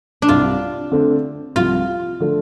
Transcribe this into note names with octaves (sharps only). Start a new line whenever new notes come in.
D4
C2 C3 G3 F4
D3 A3 C4
C2 C3 F3 F4
D3 F3 A3